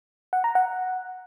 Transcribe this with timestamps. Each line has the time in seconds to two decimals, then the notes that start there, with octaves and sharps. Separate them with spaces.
0.33 F#5
0.44 A#5
0.55 F#5